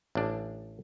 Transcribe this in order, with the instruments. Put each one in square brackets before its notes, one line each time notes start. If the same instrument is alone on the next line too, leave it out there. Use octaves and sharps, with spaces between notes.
[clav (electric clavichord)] A1 D4